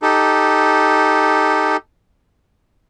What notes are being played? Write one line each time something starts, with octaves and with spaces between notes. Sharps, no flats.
D#4 G4 A4